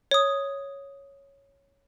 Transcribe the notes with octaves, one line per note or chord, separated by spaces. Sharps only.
C#5 D#6